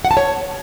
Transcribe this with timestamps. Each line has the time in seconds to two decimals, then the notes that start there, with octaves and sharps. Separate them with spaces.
0.05 F#5
0.11 A5
0.17 C#5